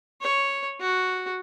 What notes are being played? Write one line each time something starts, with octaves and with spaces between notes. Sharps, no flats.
C#5
F#4